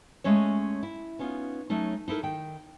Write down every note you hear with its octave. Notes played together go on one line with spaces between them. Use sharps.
G#3 A3 C#4 C#5
E4
B3 C#4 D#4 F4
F#3 A3 C#4 D#4
D#4 E4 A4 A#4
D#3 G5